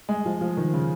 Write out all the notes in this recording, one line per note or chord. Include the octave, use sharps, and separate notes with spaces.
G#3
F3
F3
D#3
C#3